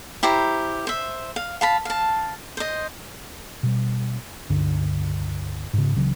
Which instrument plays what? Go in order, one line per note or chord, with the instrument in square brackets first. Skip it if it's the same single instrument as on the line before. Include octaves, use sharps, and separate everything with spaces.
[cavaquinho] E4 G4 C5 A#5
C5 E5
F5
F5 A5 B5
F5 A5
C5 D#5
[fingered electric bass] B2 G3
C#2 G2 D3
G#2 C#3
C#2 C#3 E3 F#3